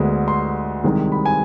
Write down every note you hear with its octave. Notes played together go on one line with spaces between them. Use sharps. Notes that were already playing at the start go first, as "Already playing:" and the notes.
Already playing: D2 D3 G#3 B3
C6
C2 C3 D#3 G#3
B5
G#5